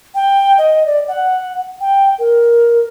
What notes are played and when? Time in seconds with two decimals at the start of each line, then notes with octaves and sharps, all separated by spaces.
0.15 G5
0.58 D#5
0.86 D5
1.08 F#5
1.81 G5
2.19 A#4